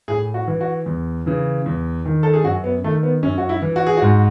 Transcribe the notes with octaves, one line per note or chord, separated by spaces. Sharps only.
A2 G#4
F#4
E3
F#4
E2
C#3 E3
E2
D#3
A4
G#4
F#2 F#4
B3
D#3 A3
B3
F#2 C#4
F#4
E4
E3
F#4
G#4
G#2 F#4